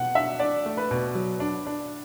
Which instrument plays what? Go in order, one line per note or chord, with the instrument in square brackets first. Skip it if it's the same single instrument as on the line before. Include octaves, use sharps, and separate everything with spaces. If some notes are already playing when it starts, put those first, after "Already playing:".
Already playing: [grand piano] B2 [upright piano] F#5
[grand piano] D4 [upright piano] E5
[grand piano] D4 [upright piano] D5
[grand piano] A3
[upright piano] B4
[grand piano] B2
F#3
D4
D4